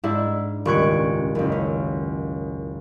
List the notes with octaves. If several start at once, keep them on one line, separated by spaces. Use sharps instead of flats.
G#2 D4 E4 E5
D#1 C#2 C#6 F#6 G#6 D7
F#1 C#2
C#4